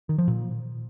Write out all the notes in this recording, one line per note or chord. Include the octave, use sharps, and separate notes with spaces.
D#3
F3
A#2